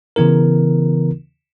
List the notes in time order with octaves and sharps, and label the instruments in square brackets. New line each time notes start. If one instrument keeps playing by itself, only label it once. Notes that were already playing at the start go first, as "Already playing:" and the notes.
[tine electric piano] C#3 E3 B3 E4 A#4